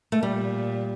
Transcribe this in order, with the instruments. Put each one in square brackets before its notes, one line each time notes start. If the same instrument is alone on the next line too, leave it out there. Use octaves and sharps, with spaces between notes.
[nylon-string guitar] A3
[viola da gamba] A#2 [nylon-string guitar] G3